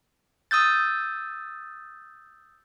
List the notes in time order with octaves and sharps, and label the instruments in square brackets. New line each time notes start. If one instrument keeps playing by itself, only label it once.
[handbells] D#6 E6 G6 A6